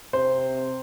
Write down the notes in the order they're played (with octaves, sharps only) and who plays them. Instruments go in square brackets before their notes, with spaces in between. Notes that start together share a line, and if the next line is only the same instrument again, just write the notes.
[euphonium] C3 [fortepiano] C5